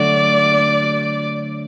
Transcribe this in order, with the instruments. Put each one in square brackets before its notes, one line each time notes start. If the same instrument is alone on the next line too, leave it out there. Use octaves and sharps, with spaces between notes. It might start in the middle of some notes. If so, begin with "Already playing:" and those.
Already playing: [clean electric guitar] D3 F#3 A3 F#4 [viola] D5